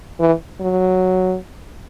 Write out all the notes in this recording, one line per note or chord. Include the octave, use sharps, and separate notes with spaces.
E3
F#3